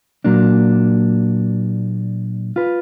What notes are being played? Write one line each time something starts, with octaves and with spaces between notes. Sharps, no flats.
A#2 F#3 A#3 D4
F4 B4